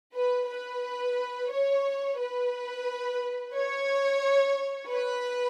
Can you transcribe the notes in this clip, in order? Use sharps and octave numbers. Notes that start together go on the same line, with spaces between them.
B4
B4
C#5
B4
C#5
B4